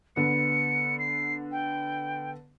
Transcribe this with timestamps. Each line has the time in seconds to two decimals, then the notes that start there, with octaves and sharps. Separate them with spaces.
0.16 D3 B3 C#7
0.99 C7
1.51 G5